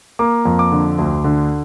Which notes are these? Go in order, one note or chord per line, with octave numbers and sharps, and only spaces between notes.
A#3 D6
F2
D6
D3
D2
D3